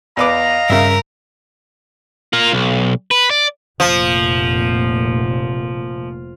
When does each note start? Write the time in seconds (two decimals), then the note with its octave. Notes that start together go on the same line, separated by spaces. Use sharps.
0.17 E2 B4 D#5 F5 A#5 D6
0.70 G2 C#3 A#4 E5
2.33 F4 A#4
2.53 B1
3.11 B4
3.31 D5
3.80 F1 A#2 F3